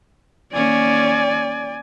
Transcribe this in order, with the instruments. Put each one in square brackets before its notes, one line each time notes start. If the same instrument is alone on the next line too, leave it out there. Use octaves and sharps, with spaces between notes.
[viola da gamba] D#3 A#3 C#4 [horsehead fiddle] D5 G#5